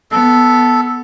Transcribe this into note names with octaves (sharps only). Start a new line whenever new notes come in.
B3 A4